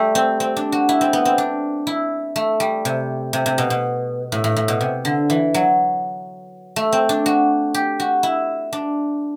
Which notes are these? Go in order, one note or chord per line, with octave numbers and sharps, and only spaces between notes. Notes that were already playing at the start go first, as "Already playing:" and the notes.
Already playing: G3 A3
C4
C4
D4
F#4
E4
C4
B3
C4
D4
E4
A3
G3
C3
C3
C3
B2
B2
A2
A2
A2
B2
C3
D3
E3
F#3
A3
C4
D4
F#4
G4
F#4
E4
D4